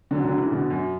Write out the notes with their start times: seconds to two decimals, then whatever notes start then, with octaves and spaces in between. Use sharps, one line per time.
0.11 D3 F#3
0.24 D3 F#3
0.37 C#3 E3
0.51 B2 D3
0.70 F#2